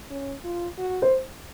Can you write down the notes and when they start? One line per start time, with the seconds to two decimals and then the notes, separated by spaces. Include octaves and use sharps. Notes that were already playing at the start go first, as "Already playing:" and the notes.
0.11 C#4
0.44 F4
0.78 F#4
1.02 C5